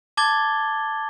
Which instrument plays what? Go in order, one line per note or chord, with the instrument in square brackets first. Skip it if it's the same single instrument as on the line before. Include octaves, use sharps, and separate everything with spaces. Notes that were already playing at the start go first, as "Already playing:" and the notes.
[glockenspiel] A5 D6 G#6 A6 G7